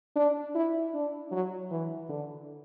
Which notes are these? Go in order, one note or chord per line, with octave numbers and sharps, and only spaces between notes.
D4
E4
D4
F#3
E3
D3